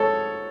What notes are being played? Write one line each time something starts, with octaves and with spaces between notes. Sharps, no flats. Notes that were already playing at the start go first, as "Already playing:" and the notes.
Already playing: G#2 A4 C#5